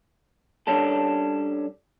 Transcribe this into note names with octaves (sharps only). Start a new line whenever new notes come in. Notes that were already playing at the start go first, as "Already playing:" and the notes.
G3 C#4 D4 A4